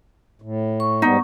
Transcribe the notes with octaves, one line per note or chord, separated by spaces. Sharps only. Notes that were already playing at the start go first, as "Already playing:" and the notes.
A2
C#6
G#2 G3 B3 D#4